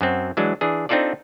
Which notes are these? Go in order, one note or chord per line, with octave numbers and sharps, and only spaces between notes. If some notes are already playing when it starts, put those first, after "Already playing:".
F#2 F#3 C4
E3 F#3 G#3 D4
E3 D4 G#4
C4 D4 D#4 F4 A4 D5